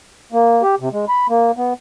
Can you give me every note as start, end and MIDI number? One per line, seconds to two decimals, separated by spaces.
0.32 0.62 58
0.62 0.75 67
0.80 0.89 48
0.93 1.05 56
1.09 1.27 83
1.29 1.51 58
1.57 1.73 59